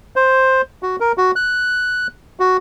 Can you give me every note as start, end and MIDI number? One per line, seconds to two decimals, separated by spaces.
0.16 0.61 72
0.83 0.96 66
1.00 1.12 70
1.18 1.31 66
1.36 2.07 90
2.40 2.57 66